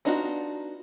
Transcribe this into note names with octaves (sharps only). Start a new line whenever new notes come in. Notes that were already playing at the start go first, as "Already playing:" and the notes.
B3 D4 D#4 F4 F#4